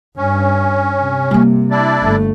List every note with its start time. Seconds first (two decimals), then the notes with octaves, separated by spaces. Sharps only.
0.17 G2 C#4
1.00 C3
1.31 G3 A#3
1.71 D4 E4 D5
2.02 G1 A3